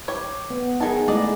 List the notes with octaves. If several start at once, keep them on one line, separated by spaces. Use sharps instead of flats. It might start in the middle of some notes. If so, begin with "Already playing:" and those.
G4 C#5
B3
D#3 D#4 G#4 G#5 A5
G#3 A3 D4 E4 D5 D#5